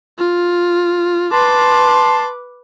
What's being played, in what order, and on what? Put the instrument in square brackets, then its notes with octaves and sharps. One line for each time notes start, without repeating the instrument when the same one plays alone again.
[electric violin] F4
[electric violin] B4 D6 [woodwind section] A5 C6